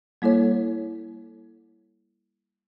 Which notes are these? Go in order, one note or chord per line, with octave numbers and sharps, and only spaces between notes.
G3 A#3 E4 A4 C#5